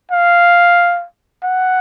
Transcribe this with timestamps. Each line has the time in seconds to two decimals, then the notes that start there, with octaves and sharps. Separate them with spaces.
0.11 F5
1.44 F#5